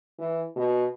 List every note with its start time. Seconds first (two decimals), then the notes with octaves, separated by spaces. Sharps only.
0.19 E3
0.56 B2